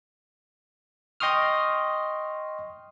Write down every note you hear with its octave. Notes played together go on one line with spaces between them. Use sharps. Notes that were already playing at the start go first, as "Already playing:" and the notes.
D#5 G5 C6 C#6 D#6 F6